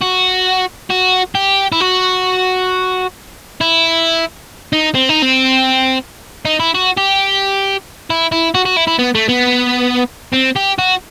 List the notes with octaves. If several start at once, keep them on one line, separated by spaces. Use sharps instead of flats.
F#4
F#4
G4
E4
F#4
E4
D#4
C4
D#4
C4
D#4
E4
F#4
G4
E4
E4
F#4
F#4
E4
E4
B3
A3
B3
C4
G4
F#4